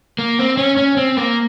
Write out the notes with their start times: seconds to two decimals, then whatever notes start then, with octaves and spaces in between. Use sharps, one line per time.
0.19 A#3
0.39 C4
0.58 C#4
0.77 C#4
0.97 C4
1.17 A#3